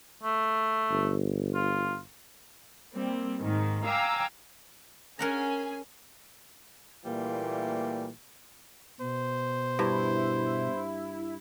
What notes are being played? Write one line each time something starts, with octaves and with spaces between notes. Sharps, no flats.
A3
G1
F4
G3 A#3 C4
G#2 D#3
F5 G5 G#5 A#5 D6 E6
C#4 G#4 A#4 F#5 G#5 A#5
A#2 E3 G3 A3 A#3
B2 C5
G2 E4